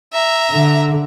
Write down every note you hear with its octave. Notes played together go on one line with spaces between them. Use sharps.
E5 A#5
D3